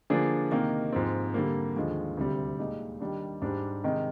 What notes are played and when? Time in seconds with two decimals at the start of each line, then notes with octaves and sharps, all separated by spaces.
0.10 D3 F3 A#3 D4 G#4
0.51 C3 D#3 A#3 D#4
0.93 G#2 F3 C4
1.34 D3 G3 A#3
1.76 D#2 D3 F3 G#3
2.17 D2 C3 G3
2.59 A#2 G#3 D#4 G4
3.00 D#3 G3 D4
3.42 G#2 G3 D4
3.84 C3 D#3 G#3 D#4